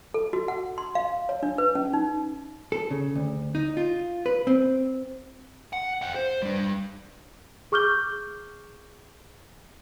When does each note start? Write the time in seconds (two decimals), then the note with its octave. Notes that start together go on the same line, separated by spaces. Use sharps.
0.14 A4
0.33 F#4
0.48 F#5
0.78 C6
0.95 F5
1.29 C#5
1.43 D4
1.58 B4
1.75 C#4
1.93 D#4
2.72 A4
2.91 C#3
3.15 D2
3.55 D#4
3.77 F4
4.26 B4
4.47 C4
5.73 F#5
6.02 F5 G5
6.15 C5
6.42 G3 D4
7.72 G#4 C#6 D6 F6 G6 G7